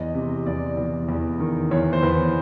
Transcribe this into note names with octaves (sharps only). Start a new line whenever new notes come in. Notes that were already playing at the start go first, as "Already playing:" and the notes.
Already playing: E2 D#5
C3
E2 D5
E2
E2
D#3
E2 C#5
C5
E2 B4